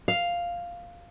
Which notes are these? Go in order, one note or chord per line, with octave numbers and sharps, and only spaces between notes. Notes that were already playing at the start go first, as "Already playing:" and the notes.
F5